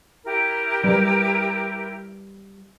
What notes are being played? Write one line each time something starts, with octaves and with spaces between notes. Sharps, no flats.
E4 G4 A#4
G3 B4